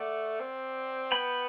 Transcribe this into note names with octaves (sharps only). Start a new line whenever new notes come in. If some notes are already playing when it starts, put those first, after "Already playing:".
Already playing: A3 D5 F#5
C4
B3 G5 B5